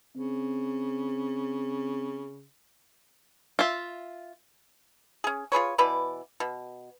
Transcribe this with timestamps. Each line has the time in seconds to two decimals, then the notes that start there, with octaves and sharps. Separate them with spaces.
0.17 C#3 C4
3.59 F4 E5
5.24 C#4 G#4
5.52 F4 G#4 B4 C#5
5.78 B2 E3 B4 D5
6.40 B2